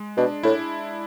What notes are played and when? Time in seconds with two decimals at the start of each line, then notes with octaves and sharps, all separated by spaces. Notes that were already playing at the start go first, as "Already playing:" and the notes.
Already playing: G#3
0.17 B2 D4
0.43 A2 E4